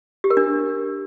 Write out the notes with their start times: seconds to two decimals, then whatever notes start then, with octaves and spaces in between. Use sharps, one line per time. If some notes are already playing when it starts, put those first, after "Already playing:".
0.24 G4
0.30 A#4
0.37 D4